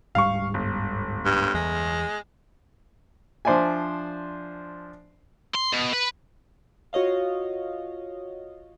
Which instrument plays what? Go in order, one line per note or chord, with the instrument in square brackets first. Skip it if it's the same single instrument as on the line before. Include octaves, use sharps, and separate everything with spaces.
[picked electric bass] D1 G#2 G3 [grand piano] F5 C#6
[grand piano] G1
[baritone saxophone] G2
[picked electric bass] E2 [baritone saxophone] G#3
[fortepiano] F3 D4 C5 D5 E5 G#5
[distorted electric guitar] C6
B2
B4
[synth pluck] F4 F#4 C#5 D#5 F5